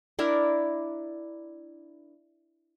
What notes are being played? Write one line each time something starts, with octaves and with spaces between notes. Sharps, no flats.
D4 E4 A#4